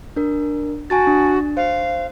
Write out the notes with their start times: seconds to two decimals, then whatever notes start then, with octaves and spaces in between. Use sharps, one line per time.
0.16 D4 A#4
0.90 F#4 G#5 A5 A6
1.07 D4
1.57 C5 F5